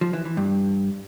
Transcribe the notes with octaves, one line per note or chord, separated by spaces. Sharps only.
F3
E3
E3
G2